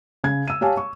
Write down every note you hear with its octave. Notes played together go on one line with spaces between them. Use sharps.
C#3 G#6
E6 D#7
G4 C#5 F5 G#5 A5
C#6